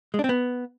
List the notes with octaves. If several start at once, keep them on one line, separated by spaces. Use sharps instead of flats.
G#3
D4
C4
B3